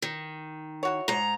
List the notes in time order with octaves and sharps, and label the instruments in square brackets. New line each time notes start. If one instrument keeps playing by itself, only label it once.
[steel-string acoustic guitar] D#3
[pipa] E4 F#4 C#5
[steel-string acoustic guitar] G#2 A#5